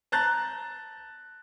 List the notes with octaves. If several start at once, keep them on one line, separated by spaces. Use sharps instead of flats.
A5 A#5 F#6 G6 A6